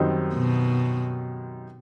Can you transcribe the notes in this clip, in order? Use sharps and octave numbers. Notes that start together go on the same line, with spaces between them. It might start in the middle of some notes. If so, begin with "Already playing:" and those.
Already playing: F#2 D#3 G3 C4 D#4
B2